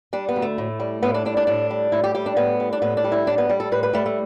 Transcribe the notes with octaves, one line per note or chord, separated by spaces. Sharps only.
G3 D4
B3
D2
A3
A2
G3
A2 B3
D4
G3 D4
D4
A2 D4
G3
A2 E4
G4
G3 G4
D4
A2 B3
G3
D4
A2 B3
D4
G3
E4
A2 D4
B3
G3
A4
A2 B4
B4
G3 A3
A3